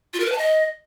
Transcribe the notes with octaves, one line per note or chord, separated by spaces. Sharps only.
F4
A#4
B4
A5
D#5